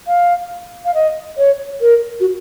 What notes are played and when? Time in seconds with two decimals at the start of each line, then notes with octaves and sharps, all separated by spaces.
0.07 F5
0.85 F5
0.94 D#5
1.37 C#5
1.81 A#4
2.20 F#4